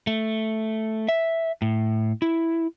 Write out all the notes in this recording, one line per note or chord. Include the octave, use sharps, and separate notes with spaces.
A3
E5
A2
E4